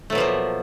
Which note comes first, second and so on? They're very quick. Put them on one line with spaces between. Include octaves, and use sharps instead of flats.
A3 F#3 B2 F3 A#3